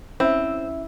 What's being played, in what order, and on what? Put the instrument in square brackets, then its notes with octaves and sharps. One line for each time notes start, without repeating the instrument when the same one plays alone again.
[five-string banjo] C4 [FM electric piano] C#4 E5 [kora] E4